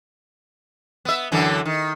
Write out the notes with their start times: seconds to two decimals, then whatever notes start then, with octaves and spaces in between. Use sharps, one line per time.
1.05 B3 E5
1.32 F#2 D3 E3
1.66 D#3